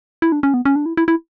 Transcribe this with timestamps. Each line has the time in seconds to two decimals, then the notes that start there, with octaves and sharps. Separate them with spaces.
0.22 E4
0.32 D4
0.43 C#4
0.54 B3
0.65 C#4
0.76 D4
0.86 E4
0.97 E4
1.08 E4